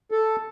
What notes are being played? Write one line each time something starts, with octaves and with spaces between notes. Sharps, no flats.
A4